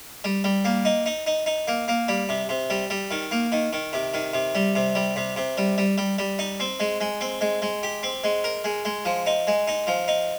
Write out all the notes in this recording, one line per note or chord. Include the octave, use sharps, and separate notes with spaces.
G3
G3
A#3
D#4
D#4
D#4
D#4
A#3
A#3
G3
C3
C3
G3
G3
D#3
A#3
D#3
D#3
C3
D#3
C3
G3
C3
G3
C3
C3
G3
G3
G3
G3
D#4
C4
G#3
G#3
C4
G#3
G#3
G4
C4
G#3
A#4
G#3
G#3
F3
D#4
G#3
D#4
F3
D#4